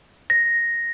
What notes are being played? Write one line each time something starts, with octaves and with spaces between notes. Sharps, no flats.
A#6